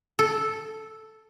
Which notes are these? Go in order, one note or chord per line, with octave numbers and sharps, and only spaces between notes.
A4